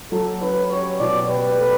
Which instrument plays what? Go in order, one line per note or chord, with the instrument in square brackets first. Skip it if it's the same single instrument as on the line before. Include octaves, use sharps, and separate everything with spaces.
[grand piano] F#3 [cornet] A4
[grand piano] C#4 [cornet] B4
[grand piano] G4 [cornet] C#5
[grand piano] B2 [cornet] D5
[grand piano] G4 [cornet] B4
[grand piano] A3